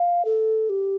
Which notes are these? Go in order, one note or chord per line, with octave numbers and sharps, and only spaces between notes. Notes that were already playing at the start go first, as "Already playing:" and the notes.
Already playing: F5
A4
G4